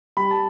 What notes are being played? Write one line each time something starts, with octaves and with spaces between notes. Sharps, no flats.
G3 B5
A5